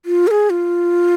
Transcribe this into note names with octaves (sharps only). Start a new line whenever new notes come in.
F4
A#4
G#4
F4